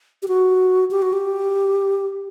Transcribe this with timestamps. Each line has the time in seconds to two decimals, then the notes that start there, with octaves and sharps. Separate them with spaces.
0.23 G4
0.28 F#4
0.91 G4
1.02 F#4
1.13 G4